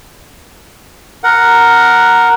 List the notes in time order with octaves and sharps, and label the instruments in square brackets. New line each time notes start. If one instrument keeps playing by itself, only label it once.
[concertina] A#4 F#5